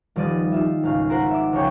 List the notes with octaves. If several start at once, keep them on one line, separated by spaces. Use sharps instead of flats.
D#1 F3 G3 D5 D#6 A6
D#4 F4 E5
G#1 C#2 F5
F4 A#4 C5 F#5
E5 D6
C#2 F3 C#5 G5